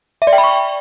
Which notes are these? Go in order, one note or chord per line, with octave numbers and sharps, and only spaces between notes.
E5
D5
G5
B5
C#6